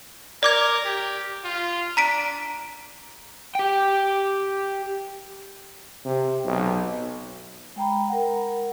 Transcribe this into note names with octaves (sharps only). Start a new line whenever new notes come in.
A#4 D5 D6 G#6
G4
F4
D4 A#5 B6 D7
G4 G5
C3
B1
G#3 G5 A#5 B5
A#4 F#5